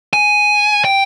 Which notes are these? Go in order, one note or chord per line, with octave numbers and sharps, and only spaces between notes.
G#5
G5